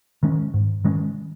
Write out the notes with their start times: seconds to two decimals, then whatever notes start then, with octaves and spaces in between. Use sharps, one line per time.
0.23 D#3 G#3 C#4
0.54 G#2
0.85 D#3 G#3 C#4